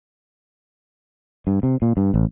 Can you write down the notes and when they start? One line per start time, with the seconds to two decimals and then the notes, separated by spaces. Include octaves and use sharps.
1.47 G2
1.63 C3
1.82 A#2
1.97 G2
2.14 A1